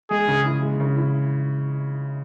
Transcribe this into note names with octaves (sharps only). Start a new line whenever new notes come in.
G#3 G#4
C#3
E4
G#3
C#3
E4